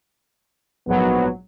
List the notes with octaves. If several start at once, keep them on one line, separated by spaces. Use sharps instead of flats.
A#1 G#2 F#3 B3